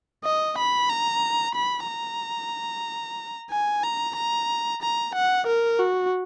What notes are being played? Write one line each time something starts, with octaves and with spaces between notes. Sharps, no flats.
D#5
B5
A#5
B5
A#5
G#5
A#5
A#5
A#5
F#5
A#4
F#4